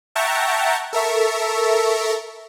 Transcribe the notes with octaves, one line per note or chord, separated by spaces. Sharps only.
E5 F#5 G5 A5 A#5 C#6
A4 A#4 E5 C#6